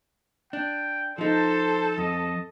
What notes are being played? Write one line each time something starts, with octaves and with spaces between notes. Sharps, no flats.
D4 G5
F3 D#4 A4 C5 A5
F2 D#5